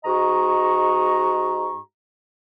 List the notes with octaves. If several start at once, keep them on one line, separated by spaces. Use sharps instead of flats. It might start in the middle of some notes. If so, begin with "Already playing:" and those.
G#2 F#4 D#5 A#5 C#6